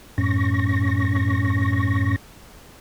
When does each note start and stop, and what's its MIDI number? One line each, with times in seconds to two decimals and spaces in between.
0.18 2.16 42
0.18 2.16 45
0.18 2.16 61
0.18 2.16 85
0.18 2.16 94